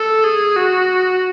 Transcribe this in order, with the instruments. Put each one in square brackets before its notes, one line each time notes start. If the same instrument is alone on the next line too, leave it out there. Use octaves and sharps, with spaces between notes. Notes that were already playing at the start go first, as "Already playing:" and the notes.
Already playing: [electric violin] A4
G#4
F#4